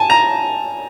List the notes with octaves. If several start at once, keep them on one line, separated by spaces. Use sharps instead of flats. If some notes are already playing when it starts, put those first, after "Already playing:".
Already playing: G#5 A5
A#5